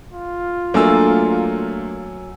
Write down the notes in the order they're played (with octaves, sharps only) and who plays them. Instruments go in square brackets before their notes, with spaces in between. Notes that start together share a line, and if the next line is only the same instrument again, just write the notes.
[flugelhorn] F4
[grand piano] F#3 G#5 E6 [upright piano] A3 A#3 D4